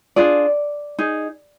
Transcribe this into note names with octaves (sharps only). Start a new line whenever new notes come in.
D4 F4 G#4 D5
D#4 G#4